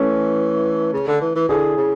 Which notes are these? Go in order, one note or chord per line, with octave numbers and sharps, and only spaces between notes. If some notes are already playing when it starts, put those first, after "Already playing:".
Already playing: E3 A3 C#4
C#3
D3
E3
E3
D3 E4 G#4
C#3